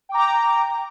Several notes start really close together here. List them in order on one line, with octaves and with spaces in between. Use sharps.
G5 D6 A#5